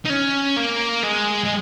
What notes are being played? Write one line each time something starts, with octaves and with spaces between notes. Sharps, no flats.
D#4
C#4
A#3
G#3
G#3